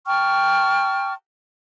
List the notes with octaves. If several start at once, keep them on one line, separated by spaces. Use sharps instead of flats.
G5 A5 C#6 F6